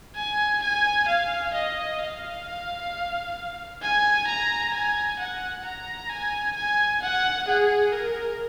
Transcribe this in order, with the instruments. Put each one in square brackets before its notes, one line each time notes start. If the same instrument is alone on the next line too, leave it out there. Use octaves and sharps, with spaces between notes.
[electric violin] G#5
G#5
F5
D#5
F5
G#5
A#5
G#5
F#5
A#5
G#5
G#5
F#5
G#4
A#4